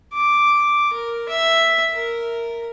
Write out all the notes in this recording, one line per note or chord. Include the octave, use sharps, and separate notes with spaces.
D6
A#4
E5
A#4